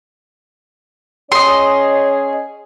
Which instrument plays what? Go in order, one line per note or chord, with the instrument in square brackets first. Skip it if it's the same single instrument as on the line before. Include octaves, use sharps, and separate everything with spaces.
[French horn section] C#4 G#4 C#5 [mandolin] D#5 C6